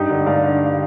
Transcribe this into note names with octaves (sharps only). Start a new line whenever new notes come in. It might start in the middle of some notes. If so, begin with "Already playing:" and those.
Already playing: G2 D#4 G4
D3
G2 D5 F5
D3